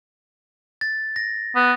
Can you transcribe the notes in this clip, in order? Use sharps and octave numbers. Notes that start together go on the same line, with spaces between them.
A6
A#6
B3